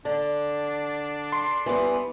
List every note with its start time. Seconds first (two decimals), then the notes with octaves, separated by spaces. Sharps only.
0.05 D3 D4
1.32 C6
1.66 E3 G3 B3